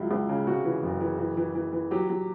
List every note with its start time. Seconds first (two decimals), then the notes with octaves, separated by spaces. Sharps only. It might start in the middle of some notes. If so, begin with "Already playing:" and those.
Already playing: C#2 F#3 E4
0.11 C#2
0.29 C#3
0.47 C3 F#4
0.65 E3
0.83 F#1
1.01 E3
1.19 E3
1.37 E3
1.55 E3
1.73 E3
1.91 F#3 G4
2.09 F#3